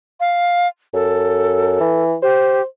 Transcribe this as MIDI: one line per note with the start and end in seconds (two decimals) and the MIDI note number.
0.20 0.68 77
0.94 1.76 42
0.94 2.03 69
1.80 2.15 52
2.22 2.62 67
2.22 2.64 72